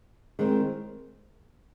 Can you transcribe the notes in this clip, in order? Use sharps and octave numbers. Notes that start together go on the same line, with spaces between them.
D#3 G#3 C4